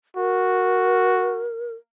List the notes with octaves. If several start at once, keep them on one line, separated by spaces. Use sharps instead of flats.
F#4 A#4